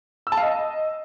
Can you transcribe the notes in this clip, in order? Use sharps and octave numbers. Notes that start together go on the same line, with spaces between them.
E6
A5
F5
D#5